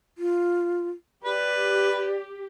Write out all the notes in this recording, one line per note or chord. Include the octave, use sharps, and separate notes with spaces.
F4
G4 B4 D5